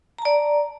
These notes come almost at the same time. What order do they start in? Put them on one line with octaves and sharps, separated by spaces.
A#5 A5 D5